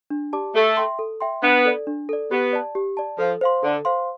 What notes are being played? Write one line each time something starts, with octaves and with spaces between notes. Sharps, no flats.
D4
G4 D5 A5 D6
A3 A4
E5 G5 C6
A4
E5 G5 C6
B3 D4
A4 D5
D4
A4 D5
B3 G4
D5 A5
G4
D5 A5
F3 A4
C5 F5 C6
D3 A4
C5 F5 C6